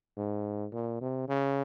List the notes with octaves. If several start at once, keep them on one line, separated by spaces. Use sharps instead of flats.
G#2
A#2
C3
C#3